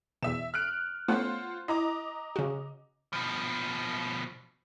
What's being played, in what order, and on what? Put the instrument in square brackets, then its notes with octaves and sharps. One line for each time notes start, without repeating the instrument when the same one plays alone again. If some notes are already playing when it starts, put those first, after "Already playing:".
[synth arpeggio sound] E2 B2 [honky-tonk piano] E5 E7
[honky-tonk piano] F6 F#6 D7
[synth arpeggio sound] A3 B3 C#4 [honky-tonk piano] F4 C5 F#5
[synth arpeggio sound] E4 [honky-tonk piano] D#5 A#5 D6
[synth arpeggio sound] C#3 F#4
[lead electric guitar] B2 F3